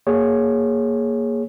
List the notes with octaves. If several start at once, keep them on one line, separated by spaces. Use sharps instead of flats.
A#3 G#4 C#5